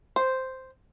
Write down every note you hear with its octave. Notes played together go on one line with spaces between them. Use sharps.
C5